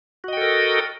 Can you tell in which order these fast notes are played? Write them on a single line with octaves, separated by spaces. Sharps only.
F#4 D#5 G5 A4 A#4